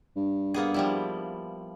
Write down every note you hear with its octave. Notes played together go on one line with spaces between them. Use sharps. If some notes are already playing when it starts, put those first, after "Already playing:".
G2
A#3 B3 G#4
F3 G3 E4